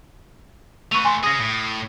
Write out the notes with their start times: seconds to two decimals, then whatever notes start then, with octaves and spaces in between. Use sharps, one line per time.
0.92 A3 B4 C#6 D#7 F7
1.05 G#5 C6
1.23 C#4 G#4 D#6 A#6
1.39 A2